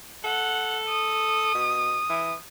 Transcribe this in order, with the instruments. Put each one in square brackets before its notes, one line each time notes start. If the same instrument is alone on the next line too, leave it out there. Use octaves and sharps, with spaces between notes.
[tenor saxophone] A4 [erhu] F#5
[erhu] D#6
[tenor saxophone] B2
E3